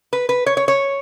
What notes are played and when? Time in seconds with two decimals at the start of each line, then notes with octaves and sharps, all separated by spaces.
0.13 B4
0.29 B4
0.46 C#5
0.57 C#5
0.68 C#5